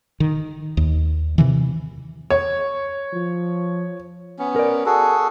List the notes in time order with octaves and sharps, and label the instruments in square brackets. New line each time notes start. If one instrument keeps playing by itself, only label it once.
[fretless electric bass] D#3
D#2
C3 D#3 E3
[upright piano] C#5
[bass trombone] F3
[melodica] B3 C#4
[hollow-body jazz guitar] A#4 D5
[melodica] F#4 G#4 A4